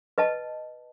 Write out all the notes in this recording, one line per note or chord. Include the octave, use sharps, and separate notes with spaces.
B4 D#5 A5